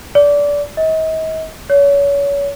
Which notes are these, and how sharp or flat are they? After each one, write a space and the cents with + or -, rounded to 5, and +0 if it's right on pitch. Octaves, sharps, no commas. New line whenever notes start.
D5 -20
D#5 +40
C#5 +30